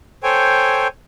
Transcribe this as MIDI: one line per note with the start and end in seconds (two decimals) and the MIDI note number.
0.23 0.87 69
0.23 0.87 72
0.23 0.87 73
0.23 0.87 79
0.23 0.87 80